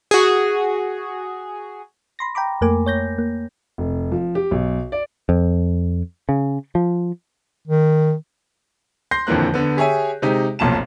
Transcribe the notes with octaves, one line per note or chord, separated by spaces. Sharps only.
F#4 G#4
B5 C6 A#6
G5 A#5 B5 D6
F2 A3 A#3 A#4 G#5 D6
C#5 G6 A#6
A#3
F1
F3
G4
B1
D5
F2
C#3
F3
D#3
C6 G6 A#6 C7
D#1 F2 D3 E3 A#3 F#6
D3 B3
G4 G#4 C#5 E5 G#5
C3 G#3 D#4 G4
F1 B1 A#2 A5 E7